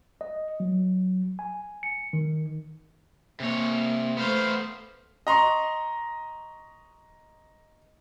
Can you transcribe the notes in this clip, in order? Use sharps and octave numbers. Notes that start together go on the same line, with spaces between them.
D#5
F#3
G#5
C#7
D#3
C3 A#3 C#5
A3 B3 C5 F5
D#5 A#5 C6 C#6